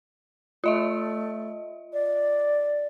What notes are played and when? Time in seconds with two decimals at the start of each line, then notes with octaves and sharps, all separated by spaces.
0.64 A3 F4 D#5 E5
1.93 D5